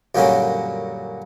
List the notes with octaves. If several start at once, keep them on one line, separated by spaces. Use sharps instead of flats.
F#2 A#2 D3 G3 A#3 C#4